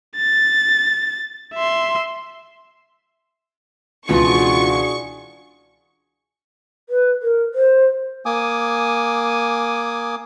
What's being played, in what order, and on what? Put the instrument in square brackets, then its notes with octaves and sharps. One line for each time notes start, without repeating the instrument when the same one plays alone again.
[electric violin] A6
E5 C6
[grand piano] C#2 B2 E3 [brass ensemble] D4 F#4 G#4 [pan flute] F4 [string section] C#6
[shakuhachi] B4
A#4
C5
[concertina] A#3 G#5 D6 D#6